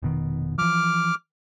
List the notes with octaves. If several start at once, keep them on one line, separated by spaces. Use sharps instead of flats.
F1 B2 D#3
E3 F3 D6 F6